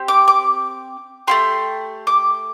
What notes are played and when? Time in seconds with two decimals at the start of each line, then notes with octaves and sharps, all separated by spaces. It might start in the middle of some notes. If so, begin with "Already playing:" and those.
Already playing: C4 G4
0.08 D6
0.28 D6
1.27 A3 E4 G4 C6
2.07 D6